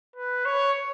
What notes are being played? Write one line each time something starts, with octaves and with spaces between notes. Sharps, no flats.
B4
C#5